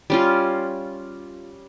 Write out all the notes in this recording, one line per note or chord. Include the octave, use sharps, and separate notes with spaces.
G3 C#4 F4